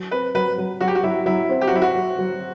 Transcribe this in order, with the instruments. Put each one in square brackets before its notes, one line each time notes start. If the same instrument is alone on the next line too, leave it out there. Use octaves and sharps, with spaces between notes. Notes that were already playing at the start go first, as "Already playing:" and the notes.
Already playing: [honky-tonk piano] F#3
[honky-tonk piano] C4 [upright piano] B4
[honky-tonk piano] F#3 [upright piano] B4
[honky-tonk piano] F#3
[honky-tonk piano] F#3 [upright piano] F#4
[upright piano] G4
F#4
[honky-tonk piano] F#3 [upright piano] E4
[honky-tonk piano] F#3 [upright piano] E4
[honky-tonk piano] C4
[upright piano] G4
F#4
[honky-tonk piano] F#3 [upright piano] E4
[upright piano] F#4
[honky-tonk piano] F#3
F#3